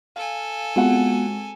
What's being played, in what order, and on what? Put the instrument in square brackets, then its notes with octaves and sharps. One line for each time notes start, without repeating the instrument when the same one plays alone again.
[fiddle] A4 G#5 [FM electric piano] F5
[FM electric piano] G#3 C4 F#4 [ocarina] B3 [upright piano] F4 F#5